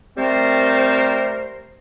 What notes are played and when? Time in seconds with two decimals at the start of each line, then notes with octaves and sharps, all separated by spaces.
0.17 G3 A3 C4 A#4 C5